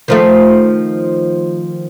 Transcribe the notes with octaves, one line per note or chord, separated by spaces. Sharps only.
D#3 F3 A3